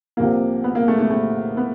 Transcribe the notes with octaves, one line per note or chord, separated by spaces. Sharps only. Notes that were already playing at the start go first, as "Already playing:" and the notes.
C2 C3 F3 A#3
B3
A#3
A3
A3
A3
B3